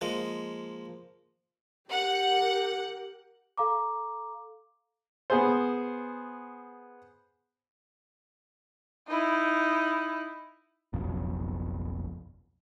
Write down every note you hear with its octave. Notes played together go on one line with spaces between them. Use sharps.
F3 G#3 A#3 D#5
G4 A#4 F#5
A4 F5 A#5 D6
B3 G#4 C5
D#4 E4
F#1 B1 F2